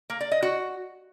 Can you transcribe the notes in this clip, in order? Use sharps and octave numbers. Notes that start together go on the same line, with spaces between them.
A#3
D5
D#5
F#4